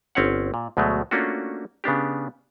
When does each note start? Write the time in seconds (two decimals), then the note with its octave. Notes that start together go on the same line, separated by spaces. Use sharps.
0.15 G1 C4 C#4 C#5 F#5
0.54 A#2
0.77 D2 B2 F#3 G#3 A3
1.11 A3 A#3 C#4 D4 F4 F#4
1.84 C#3 B3 D4 G4